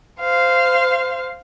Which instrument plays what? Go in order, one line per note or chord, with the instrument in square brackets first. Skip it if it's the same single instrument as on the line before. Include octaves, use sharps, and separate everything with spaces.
[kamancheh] C5 F5